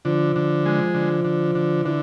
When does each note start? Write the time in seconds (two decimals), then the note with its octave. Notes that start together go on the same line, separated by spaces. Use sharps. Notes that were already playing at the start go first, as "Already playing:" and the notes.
0.05 D3 F3
0.36 D3
0.65 G#3
0.95 D3
1.25 D3
1.55 D3
1.85 D3 E3